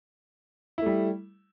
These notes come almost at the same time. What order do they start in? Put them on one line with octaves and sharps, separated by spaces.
E4 A3 G3